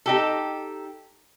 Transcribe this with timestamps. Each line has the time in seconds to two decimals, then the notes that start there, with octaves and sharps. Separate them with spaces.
0.06 D#4 G4 A4